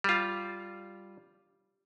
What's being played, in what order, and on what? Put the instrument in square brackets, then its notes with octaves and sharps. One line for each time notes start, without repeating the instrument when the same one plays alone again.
[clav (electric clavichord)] G3 F4